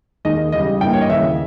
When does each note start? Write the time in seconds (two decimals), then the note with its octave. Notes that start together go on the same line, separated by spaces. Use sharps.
0.25 D#2 D#3 G#3 D#4 D#5
0.52 E2 C#3 G3 D#5
0.81 G2 E3 A#3 G5
0.93 C#5
1.01 D#5
1.09 D#2 C#3 E3 E5